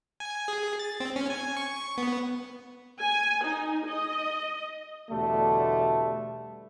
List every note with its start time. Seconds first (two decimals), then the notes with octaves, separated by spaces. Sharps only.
0.20 G#5
0.48 G#4
0.79 A6
1.00 C4
1.16 C#4
1.30 G#5
1.57 C#6
1.98 B3
3.01 G#5
3.45 D#4
3.88 D#5
5.10 E2 B2 D3 G3 A3